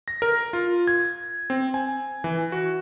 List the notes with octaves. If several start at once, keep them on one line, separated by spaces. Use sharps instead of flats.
A#6
A#4
F4
G#6
C4
G#5
E3
F#4